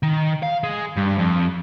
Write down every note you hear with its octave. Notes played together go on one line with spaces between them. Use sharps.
D#3
F5
G#3
G2
F2